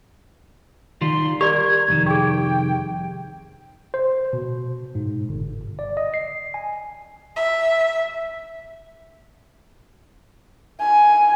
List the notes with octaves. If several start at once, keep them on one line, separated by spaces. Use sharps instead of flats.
D#3 G3 F4 C6
G4 A#4 D5 G#6
C2 F2 D#3
G4 G#4 G5
C5
B2
G#2
G1
D5
D#5
C7
G#5
E5
G#5